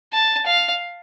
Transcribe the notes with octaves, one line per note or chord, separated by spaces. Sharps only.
A5
F5